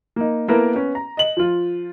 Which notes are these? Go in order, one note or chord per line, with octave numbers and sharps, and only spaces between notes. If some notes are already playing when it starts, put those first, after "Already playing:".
A#3 D#4
A#3 B3 E4 A4 A#4
B3 C#4
A#5
D#5 F#7
F3 F4